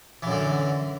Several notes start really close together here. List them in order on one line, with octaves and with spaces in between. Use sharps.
E3 F#2 D3